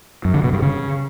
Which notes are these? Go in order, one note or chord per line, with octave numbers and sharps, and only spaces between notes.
F#2
D3
B2
G2
C#3